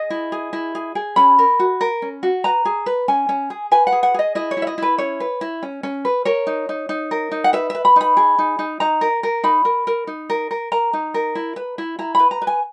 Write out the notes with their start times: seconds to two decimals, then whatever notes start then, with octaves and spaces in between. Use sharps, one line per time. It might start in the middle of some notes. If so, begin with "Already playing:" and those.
Already playing: G#4 D#5
0.10 E4
0.32 G#4
0.53 E4
0.75 G#4
0.95 G#4
1.16 C#4 B5
1.39 A#4
1.59 F#4
1.81 A#4
2.02 C#4
2.23 F#4
2.44 B4 A#5
2.65 G#4
2.86 B4
3.08 C#4 G#5
3.29 C#4
3.50 G#4
3.72 B4 G#5
3.87 F#5
3.92 G#4
4.03 F#5
4.14 G#4 D#5
4.35 E4 D#5
4.51 C#5
4.57 E4
4.62 E5
4.67 D#5
4.78 E4 B4
4.98 C#4 C#5
5.20 B4
5.41 E4
5.63 C#4
5.83 C#4
6.05 B4
6.25 A#4 C#5
6.47 D#4
6.69 D#4
6.89 D#4
7.11 A#4
7.32 D#4
7.44 F#5
7.53 B4 E5
7.70 B4 E5
7.85 B5
7.96 D#4 B5
8.17 G#4
8.39 D#4
8.59 D#4
8.80 D#4 A#5
9.01 A#4
9.23 A#4
9.44 D#4 B5
9.65 A#4
9.87 A#4
10.07 D#4
10.30 A#4
10.51 A#4
10.72 A#4 A#5
10.93 D#4
11.14 A#4
11.35 E4
11.56 B4
11.78 E4
11.99 E4 A#5
12.15 B4 B5
12.31 A#5
12.42 B4
12.47 G#5